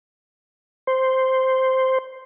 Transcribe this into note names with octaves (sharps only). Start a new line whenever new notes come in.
C5